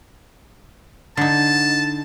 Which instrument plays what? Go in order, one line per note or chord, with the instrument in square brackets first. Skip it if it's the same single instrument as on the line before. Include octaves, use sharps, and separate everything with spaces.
[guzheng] D3 D#4 [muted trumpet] A5